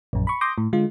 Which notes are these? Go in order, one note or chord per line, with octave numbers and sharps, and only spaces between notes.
A#1 F#2
B5 C#6
C6 D6 D#6 G6 A#6
A2
D3 G#3 F4